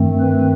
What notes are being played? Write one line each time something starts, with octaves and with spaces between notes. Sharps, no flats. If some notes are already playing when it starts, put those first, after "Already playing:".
Already playing: G2 D#3 A3 C4
B4